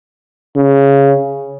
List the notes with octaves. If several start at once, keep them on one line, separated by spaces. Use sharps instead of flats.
C#3